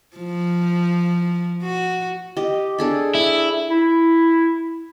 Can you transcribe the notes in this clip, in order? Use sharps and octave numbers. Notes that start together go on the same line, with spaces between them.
F3
F#4
G4 D#5
D4 G#4 A4
E4
E4